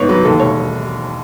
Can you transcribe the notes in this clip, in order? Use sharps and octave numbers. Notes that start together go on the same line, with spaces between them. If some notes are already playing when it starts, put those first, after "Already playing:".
Already playing: G#1 G#2 B3 C#5
F#3 B4
D#2 A4
E1 C#5